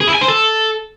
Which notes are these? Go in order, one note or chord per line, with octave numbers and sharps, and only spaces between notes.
G#4
E4
G#5
C5
A4